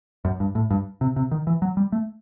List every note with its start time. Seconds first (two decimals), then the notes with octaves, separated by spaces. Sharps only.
0.25 F#2
0.40 G2
0.55 A2
0.71 G2
1.01 C3
1.16 C3
1.31 D#3
1.47 E3
1.62 F#3
1.77 G3
1.92 A3